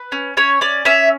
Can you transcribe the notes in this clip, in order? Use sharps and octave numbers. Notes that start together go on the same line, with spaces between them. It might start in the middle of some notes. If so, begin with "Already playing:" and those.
Already playing: B4
C#4
C#4 C#5
C#4 D5
C#4 E5